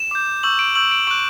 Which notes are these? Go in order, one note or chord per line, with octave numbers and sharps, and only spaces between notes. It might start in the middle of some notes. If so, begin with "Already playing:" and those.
Already playing: E7
D6 G6
C#6 E6 G6 F#7
D7
C#6 E6 G6 F#7
D7
C#6 F#6 D7